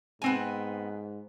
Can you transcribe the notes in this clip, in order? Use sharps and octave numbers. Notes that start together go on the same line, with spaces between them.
G#2 B3 C4 G#5